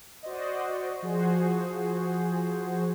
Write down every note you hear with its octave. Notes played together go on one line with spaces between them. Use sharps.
F#4 C5 D5 D#5
F3 F#4 G#4 C5